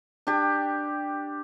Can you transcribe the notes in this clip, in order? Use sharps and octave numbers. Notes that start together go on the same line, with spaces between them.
D4 G4